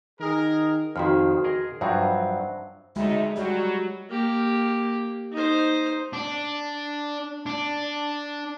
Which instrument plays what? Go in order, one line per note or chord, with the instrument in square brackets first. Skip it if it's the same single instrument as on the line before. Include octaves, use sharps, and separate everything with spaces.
[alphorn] D#3 [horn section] G#4 A#4
[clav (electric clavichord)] F2 D#3 [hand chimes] F#4 C6 F6
[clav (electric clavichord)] G#4 A#4 D#5
[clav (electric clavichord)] G2 F3 F#3 [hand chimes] C5 E5 F#5
[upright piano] D2 [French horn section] A2 D#4 [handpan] G#3 [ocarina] E5
[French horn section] F#3 [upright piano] G3 [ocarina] F#4
[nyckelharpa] A#3 G4
D#4 C5
[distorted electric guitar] D4
D4